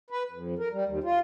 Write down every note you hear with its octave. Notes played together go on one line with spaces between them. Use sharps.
B4
F2
A#4
G3
D#2
F4